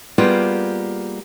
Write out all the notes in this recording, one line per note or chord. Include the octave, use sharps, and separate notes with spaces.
G3 A#3 B3 F4 G4 G#4